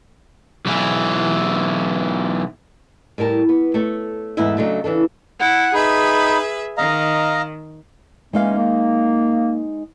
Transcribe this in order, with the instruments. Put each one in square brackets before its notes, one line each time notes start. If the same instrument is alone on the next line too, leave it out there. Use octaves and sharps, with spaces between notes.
[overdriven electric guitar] B1 E3
[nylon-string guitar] A2 G3 A#4 A5
B3
A3 A4 C#5
E2 G#2 A3 B3 E4 E5
C#3 F#3 A3 D4 D#4
C#3 E3 D4 A4
[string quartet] E4 [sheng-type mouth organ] F#5
[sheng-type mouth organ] D#4 B5 [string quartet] G#4 B4 E5
[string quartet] D#3 [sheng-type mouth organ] D#5 F5 A#5
[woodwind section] E3 A#3 C#4 [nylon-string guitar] G#3 D#4 F5
[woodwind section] A#3